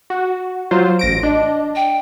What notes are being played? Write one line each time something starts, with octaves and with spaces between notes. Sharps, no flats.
F#4
F#3 F4 C5
A1 A#6 D7
D4 D#5
G5